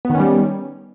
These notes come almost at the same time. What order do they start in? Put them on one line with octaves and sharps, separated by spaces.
B3 D#3 C#4 G3